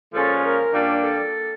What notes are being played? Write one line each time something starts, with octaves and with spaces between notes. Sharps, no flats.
A#2 F3 G#3 C#4 F4 A4
A#4
A#2 G3 A#3 D4
A4